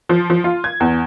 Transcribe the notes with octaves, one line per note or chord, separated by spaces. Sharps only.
F3
F3
F4
G#6
E2